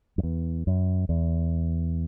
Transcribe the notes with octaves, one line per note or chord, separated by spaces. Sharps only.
F#2
E2
F#2
E2